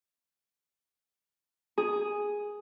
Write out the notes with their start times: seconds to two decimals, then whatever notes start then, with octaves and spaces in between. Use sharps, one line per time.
1.78 G#4